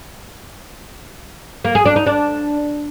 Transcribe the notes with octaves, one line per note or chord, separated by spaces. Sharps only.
A#3
G#4
D4
D#4
D4